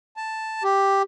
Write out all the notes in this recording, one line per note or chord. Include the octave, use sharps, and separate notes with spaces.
A5
G4